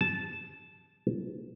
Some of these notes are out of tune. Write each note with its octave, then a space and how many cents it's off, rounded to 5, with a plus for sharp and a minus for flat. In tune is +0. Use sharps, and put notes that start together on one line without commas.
A5 -10